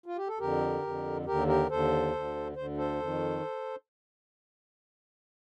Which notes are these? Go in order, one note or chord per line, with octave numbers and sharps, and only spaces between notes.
F4
G4
A4
F2 D3 G4 A#4
F2
D3
D#2 D3 G4 A#4
G4 A#4
D#2 D3 A4 C5
D2 D3
D2 D3 C5
A4 C5
F2 D#3